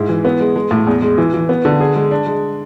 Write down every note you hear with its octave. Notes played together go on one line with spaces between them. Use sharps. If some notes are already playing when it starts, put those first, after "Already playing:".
Already playing: G#2 E4
E3
B3
G#3
G#3
A2
E2
G#3
E3
E3
B3
D3
G#4
G#3
D4
G#3